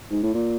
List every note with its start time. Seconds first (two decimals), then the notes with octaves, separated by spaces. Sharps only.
0.10 G#2
0.22 A2
0.34 A#2